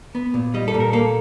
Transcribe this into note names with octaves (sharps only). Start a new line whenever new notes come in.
B3
A#2
G3 D#5
A4
A#2
A#4
A#3 A4